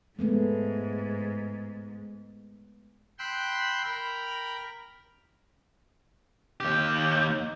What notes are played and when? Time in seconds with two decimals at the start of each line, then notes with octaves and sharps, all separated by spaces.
0.19 G#2 G#3 A3 B3
3.19 G5 B5 C6 E6 F#6 G6
3.84 A#4 G5 A#5 B5
6.60 D#2 G4